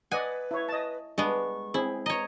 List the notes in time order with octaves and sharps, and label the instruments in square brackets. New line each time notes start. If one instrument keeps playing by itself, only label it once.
[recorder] B4 [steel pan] D5 D#5 F#5 [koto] G#5
[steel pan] E4 C#5
D#5 A5
[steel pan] G3 D4 [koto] G#3 B3 [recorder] C#6
[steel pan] C4 G#4 [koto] E4
[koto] C#5 D#5 [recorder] A#5